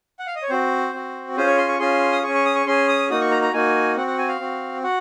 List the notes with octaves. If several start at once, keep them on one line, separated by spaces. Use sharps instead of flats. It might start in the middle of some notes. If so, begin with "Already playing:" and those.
F#5
F5
D#5
C#5
C4 F#4 C5
C4 F#4
C#4 F4 G#4 C5
C#5
C6
C#6
C#4 F4 G#4 C6
D#6
C#4 G#4 C#6
C#6
D#6
C#6
C#4 G#4 C6
D#6
A#3 D#4 F#4 D#6
C#6
A#5
A#5
A#3 D#4 F#4 G#5
C4 F#4 F#5
F#5
G#5
F5
C4 F#4
F#4 F#5